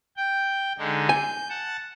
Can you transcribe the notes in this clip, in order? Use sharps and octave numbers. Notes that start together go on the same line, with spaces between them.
G5
D3 G#3 D#4
G#5 G6
F#5 A5